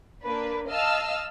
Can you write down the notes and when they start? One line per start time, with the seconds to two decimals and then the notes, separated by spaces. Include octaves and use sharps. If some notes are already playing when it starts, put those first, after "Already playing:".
0.22 A#3 D4 B4
0.68 D#5 F5 A5 E6 F6